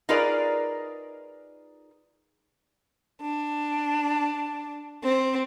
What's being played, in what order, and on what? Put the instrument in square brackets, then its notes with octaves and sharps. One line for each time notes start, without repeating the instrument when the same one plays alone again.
[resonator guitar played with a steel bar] D#4 F4 G#4 A#4 B4 D5
[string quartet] D4
C4